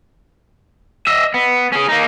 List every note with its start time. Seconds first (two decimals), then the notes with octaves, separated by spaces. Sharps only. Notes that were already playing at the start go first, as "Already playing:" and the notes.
1.07 D#5 E5
1.34 B3
1.72 C#4 G#4
1.88 A#3 D#4